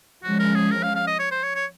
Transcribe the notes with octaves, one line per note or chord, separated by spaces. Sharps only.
F3 G#3 C#4 F#4
A#4
G#4
A#4
F5
F5
D#5
C#5
C5
C#5
C#5